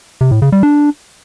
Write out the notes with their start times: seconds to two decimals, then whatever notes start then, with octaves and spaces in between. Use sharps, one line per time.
0.21 C3
0.31 A2
0.42 C#3
0.52 G3
0.63 D4